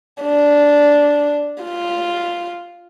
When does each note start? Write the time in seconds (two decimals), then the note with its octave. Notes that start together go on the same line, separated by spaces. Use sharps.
0.22 D4
1.63 F4